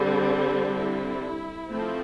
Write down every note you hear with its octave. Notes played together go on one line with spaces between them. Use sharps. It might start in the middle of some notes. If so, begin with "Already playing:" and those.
Already playing: D3 G3 C4
G4
E4
F3 A3 C4